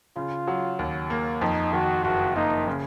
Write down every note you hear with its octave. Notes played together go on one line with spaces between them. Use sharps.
C#3 F4
F#3
D#2
A#3
F2 D#4
D#3 F#4
F#1 F#4
A#3 D#4
C#3